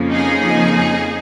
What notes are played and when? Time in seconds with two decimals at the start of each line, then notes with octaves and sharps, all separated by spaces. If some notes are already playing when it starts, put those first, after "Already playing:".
Already playing: F2 C#3 F3 A#3
0.12 D#4 G#4